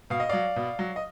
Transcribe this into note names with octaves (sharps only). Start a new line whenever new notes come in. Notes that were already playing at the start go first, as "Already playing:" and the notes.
B2 F5
D#5
F#3 D5 F5
B2
F#3
D#5